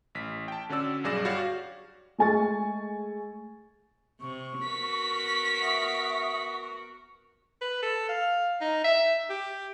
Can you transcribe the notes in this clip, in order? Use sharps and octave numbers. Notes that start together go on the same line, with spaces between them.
A1 B6
G5 A5
D3 C#4 F#4 D5 E6
B1 G2 G#4 D5 A#6 E7
F#4 G4 C#5 D5 F5
G#3 A3 G#5 C#6 A6
C3 C#6
B3 F#4 A#4 B6
E5 F#5 D#6
B4
A4
F5
D#4
E5
G4